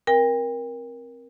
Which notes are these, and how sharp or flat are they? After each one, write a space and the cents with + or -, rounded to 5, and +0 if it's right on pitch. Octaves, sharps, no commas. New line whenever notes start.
C4 +10 A#4 +20 G5 +35